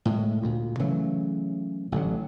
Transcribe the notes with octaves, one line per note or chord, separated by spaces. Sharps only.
A2 G#3
D2 A#2
C#3 E3 F#3 A3
A1 D3 F#3